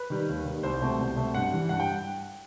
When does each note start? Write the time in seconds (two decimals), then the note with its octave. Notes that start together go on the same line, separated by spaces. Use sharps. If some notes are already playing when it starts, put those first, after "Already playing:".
Already playing: B4
0.10 D#3 G3
0.29 D#2
0.45 D#3 G3
0.63 C2 C5
0.81 B2 A3 C4
0.99 C2
1.16 B2 A3 C4
1.35 G2 F#5
1.52 E3 G3
1.69 G2 F#5
1.80 G5